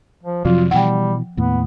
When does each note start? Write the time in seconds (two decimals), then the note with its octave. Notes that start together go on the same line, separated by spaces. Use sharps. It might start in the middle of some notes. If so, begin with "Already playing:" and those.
0.23 F3
0.45 F2 C3 F3 F#3 F4
0.71 B2 E3 G3 F#5 G5
1.37 D#2 A2 B3